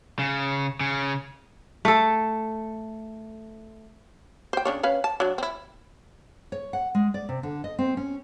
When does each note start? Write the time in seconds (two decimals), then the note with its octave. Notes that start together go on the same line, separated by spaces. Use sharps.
0.19 C#3
0.81 C#3
1.85 A3 A4
4.53 C5 G5
4.65 C#3 D4 C#5
4.83 C#4 B4 F5
5.04 A5
5.20 F#3 D4
5.38 C4 E4
6.52 C#5
6.73 F#5
6.95 G#3
7.14 D5
7.29 C3
7.43 D3
7.64 D#5
7.79 C4
7.97 C#4